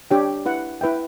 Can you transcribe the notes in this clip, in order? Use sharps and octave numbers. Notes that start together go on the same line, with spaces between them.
D4 G4 C#5 G5
E4 B4 F#5
E4 B4 E5 G5